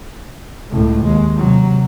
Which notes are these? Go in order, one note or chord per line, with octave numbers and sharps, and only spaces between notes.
C#2 A2
D#2 G#3
C3 F#3